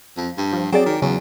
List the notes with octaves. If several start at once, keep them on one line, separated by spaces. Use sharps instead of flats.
F2
G2
F3
F#3 C4 G#4 D5
D#3
E2 C#3 F#3